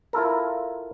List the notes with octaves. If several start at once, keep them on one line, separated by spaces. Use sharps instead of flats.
E4 F4 A4 A#4